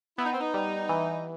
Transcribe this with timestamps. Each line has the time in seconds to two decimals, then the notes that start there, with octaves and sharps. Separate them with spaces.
0.18 B3 E4
0.25 D#4
0.33 C4
0.41 D#4
0.54 G3
0.89 E3